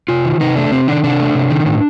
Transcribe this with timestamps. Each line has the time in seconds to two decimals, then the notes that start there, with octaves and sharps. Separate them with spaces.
0.08 C3 F4
0.25 D#3
0.41 C3 D#4
0.56 A3 D4
0.72 C3 C4
0.87 D#3 D4
1.04 C3 D4
1.20 A3
1.35 C3
1.50 D#3
1.66 A2